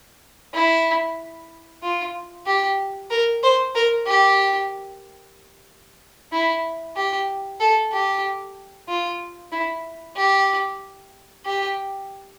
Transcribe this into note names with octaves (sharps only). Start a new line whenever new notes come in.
E4
F4
G4
A#4
C5
A#4
G4
E4
G4
A4
G4
F4
E4
G4
G4